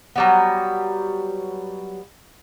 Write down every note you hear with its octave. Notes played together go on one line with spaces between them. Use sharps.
F#3 G3 B3